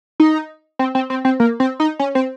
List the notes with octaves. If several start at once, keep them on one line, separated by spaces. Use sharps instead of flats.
D#4
C4
C4
C4
C4
A#3
C4
D#4
C#4
C4